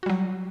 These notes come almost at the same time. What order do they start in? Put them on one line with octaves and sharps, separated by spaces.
F#4 G3 F#3